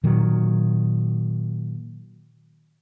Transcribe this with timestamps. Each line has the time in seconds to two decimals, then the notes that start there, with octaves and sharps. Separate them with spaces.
0.04 A#2 D#3 F#3